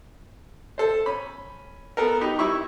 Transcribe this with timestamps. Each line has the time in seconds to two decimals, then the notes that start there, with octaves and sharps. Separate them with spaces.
0.78 A4 C5
1.06 C#4 B5
1.97 B3 A4 A#4
2.21 D#4 G4 B5
2.39 G3 E4 E5 B5 C#6